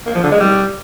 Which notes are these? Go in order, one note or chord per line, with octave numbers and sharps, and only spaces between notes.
A#3
F3
D3
G#3
G3